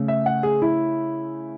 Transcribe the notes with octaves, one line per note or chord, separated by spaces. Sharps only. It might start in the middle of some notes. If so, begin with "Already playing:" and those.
Already playing: C#3 A3 C#4
E5
F#5
G#4
E4